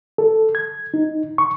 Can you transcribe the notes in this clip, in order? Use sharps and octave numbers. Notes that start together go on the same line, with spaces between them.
A4
G#6
D#4
C#6